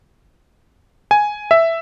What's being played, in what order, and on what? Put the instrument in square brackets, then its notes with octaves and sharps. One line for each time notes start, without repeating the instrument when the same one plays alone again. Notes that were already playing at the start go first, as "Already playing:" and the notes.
[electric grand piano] G#5
E5